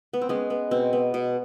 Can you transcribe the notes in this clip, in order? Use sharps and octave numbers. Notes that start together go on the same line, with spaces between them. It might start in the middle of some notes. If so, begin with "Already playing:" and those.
B3
C4
G#3 B3 C#4
B3
B2 C4
B3
B2